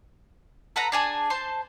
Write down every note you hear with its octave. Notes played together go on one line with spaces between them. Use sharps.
A4 B4 F#5 A#5
D4 G#4 G#5 A5
C5 A5 C6